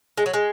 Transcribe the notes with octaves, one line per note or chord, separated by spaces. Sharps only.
G#3
F#3
G#3